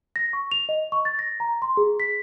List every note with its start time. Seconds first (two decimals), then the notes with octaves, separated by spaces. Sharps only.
0.16 A#6
0.33 C#6
0.51 F7
0.69 D#5
0.92 C#6
1.05 A6
1.19 A#6
1.40 A#5
1.62 C6
1.77 G#4
2.00 B6